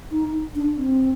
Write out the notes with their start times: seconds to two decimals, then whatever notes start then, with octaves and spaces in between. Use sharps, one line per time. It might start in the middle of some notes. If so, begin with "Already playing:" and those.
0.11 D#4
0.55 D4
0.77 C4